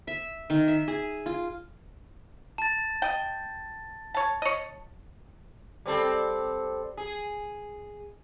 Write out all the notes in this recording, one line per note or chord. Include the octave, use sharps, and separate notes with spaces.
E5
D#3
E5
G#4
F4
A5 A6
D#5 G5
C#5 A5
C#5 D#5
G3 C4 A4
G#4